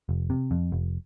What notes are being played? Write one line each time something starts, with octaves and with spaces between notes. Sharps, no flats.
F1
C3
F2
F1